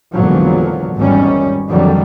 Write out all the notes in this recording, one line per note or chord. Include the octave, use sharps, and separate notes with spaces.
G#1 E2 A#2 D3 F3 F#3
G#1 E2 G#2 D#3 G3 C#4
F2 D3 D#3 F#3 G3